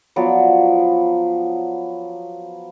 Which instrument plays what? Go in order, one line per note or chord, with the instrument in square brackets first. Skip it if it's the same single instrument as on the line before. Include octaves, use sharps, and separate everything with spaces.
[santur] F3 F#3 B3 D5